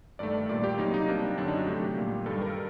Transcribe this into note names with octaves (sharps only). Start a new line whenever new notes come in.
G2 D#3 A3 D5
A#2 G3 A#3 D5
G4
C3 F#3 A#3 D#4
D#4
C3 G3 A#3 D4
F#2 D3 F#3 D4
D#4
F#4
C3 F#3 A3 G4
A#2 G3 A#3
G2 D#3 G3 A4
A#4